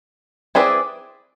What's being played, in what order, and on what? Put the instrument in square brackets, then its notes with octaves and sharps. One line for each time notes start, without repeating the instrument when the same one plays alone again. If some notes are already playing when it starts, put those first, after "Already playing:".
[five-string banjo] C4 E4 G#4 B4 D5